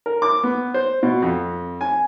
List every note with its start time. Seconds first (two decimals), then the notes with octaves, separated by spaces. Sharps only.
0.06 A#4
0.22 D6
0.43 B3
0.74 C5
1.03 B2
1.22 F2
1.81 G#5